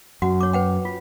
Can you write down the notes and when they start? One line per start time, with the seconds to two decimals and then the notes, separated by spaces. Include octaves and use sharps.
0.22 F#2 F#4 F#5
0.41 C#5 D6
0.53 B4 F#5 G5
0.85 F4